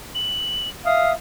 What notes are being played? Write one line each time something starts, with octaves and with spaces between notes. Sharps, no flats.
F#7
E5 F5 D#6